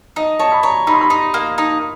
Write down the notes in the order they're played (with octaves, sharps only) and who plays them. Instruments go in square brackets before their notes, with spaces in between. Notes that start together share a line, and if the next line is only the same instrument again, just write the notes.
[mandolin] D#4 [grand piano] D#5
[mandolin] C#5 [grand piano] A5
[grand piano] B5
[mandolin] C#5 [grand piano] A#5
[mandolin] D#4 [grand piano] B5
[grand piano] C6
B5
[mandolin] D#4
A#3
D#4